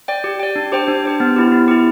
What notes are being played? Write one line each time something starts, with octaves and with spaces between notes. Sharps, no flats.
D5 G5
G4
D5 G5
D4
G4 C5 G5
D4
G4 C5 G5
B3
E4 G4
B3
E4 G4